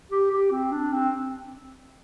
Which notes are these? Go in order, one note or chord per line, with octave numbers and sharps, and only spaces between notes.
G4
G4
C4
D4
C4